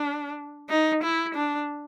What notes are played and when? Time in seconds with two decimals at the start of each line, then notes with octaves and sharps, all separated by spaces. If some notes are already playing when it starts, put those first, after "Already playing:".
Already playing: D4
0.69 D#4
1.03 E4
1.35 D4